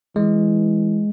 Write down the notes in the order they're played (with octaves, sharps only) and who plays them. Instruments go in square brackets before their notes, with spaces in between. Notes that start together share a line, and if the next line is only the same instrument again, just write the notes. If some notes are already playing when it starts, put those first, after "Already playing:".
[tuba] E3 [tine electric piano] G#3